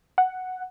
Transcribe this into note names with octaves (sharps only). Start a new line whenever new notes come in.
F#5